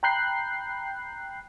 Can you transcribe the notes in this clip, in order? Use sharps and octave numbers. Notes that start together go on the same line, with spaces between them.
G5 A#5 B5 F#6 G6 C7